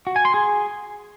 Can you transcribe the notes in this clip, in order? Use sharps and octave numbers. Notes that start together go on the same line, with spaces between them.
F#4
G#5
C6
G#4